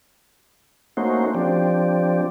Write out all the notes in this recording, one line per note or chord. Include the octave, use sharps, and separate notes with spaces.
A3 A#3 C#4 D#4 F#4 C5
F3 C4 D4 G4